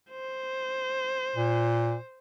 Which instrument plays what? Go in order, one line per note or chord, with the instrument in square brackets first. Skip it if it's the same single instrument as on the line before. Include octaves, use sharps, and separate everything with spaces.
[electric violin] C5
[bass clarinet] A#2